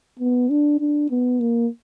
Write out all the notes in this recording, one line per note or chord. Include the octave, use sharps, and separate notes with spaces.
B3
D4
D4
B3
A#3